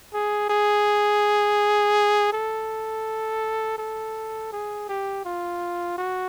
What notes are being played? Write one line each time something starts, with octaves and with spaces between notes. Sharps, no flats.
G#4
G#4
A4
A4
G#4
G4
F4
F#4